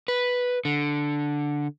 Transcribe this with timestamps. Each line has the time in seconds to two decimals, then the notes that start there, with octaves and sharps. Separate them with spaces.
0.08 B4
0.65 D3